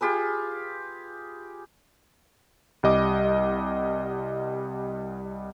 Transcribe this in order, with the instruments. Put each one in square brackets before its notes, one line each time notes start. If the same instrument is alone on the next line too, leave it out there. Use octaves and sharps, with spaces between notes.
[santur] F4 G4 G#4 B4
[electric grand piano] C2 G3 D#5 D6